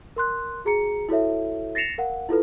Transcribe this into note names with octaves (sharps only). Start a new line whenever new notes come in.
A#4 C6 F#6
F#4 G#4 A#5 C#7
E4 F#4 A4 C#5 E5
A6 A#6 C7 C#7 E7 F7
A#4 F5 F#5
E4 F4 A4 B4